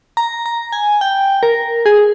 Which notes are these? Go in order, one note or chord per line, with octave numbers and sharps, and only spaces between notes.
A#5
A#5
G#5
G5
A#4
G#4